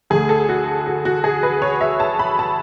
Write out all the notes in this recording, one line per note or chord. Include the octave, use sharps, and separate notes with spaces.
D2 D3 A3 G#4
A4
F#4
F#4
F#4
G#4
B4
C#5
E5
A5
B5
A5